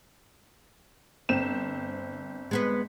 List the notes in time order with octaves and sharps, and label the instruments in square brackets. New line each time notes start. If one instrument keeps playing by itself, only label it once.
[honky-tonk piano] G1 C4 E7
[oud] G#3 B3 B4